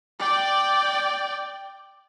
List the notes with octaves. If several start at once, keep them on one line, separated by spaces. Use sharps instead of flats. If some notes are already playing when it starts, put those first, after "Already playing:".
D5 G5